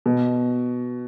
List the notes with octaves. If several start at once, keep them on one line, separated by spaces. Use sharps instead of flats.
B2